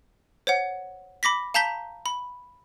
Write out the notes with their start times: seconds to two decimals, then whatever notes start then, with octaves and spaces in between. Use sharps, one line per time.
0.47 C5 C#5 F#5
1.23 B5 D6 A#6 B6
1.54 F5 A5 A#5 G6 B6 G7
2.06 B5